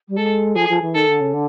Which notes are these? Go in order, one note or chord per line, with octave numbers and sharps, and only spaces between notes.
G3
G#3 A4
F3 G#4
F3
E3
D#3 A4
D3
C#3
D3